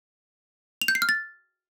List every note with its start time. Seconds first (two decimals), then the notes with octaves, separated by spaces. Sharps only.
0.82 F7
0.88 G6
0.95 C7
1.02 F6
1.09 A6